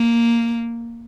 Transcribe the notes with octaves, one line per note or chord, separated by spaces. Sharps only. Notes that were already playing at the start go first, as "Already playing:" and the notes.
Already playing: A#3